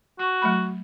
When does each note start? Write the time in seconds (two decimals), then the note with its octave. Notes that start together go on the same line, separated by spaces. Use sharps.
0.19 F#4 C#6
0.42 F#3 A3 B5